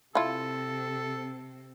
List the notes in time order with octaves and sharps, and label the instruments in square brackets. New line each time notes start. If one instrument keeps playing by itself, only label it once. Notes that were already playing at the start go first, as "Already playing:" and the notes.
[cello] C3 C4 [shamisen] E4 F4 [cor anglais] A4